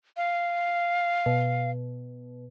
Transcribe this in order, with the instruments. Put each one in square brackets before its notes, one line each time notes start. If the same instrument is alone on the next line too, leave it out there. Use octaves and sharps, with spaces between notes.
[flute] F5
[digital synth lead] B2